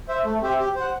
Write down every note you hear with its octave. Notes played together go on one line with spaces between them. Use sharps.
C5 E5
A3
C4 G4 C5 E5
G4
C5
F#5